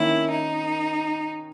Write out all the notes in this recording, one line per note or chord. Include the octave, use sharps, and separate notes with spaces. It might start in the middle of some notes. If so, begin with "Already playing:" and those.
Already playing: D#3 A#3 C#4 E4
D#4